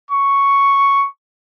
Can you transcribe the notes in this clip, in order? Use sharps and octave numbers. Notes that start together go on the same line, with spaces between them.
C#6